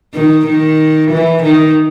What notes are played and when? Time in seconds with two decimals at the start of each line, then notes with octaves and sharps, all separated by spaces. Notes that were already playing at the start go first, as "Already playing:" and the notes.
0.14 D#3
0.47 D#3
1.11 E3
1.42 D#3